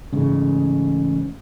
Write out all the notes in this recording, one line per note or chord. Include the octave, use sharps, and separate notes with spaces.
A1 G#2 C#3